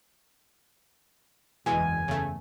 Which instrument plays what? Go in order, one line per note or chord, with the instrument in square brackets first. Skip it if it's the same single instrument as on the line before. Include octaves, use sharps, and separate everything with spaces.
[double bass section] F#1 E2 [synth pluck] B2 E3 G#3 [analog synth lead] G#5
[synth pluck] C#3 A3